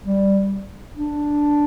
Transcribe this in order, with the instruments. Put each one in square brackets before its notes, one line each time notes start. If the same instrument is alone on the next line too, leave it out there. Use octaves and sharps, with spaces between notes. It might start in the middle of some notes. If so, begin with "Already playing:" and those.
[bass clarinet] G3
D4